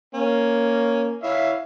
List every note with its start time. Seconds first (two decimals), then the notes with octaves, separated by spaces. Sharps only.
0.14 A#3 C#4
1.23 E4 C#5 E5 F5